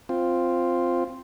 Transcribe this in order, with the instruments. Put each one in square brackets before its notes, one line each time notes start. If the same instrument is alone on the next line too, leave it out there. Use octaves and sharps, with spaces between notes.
[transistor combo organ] C4 F4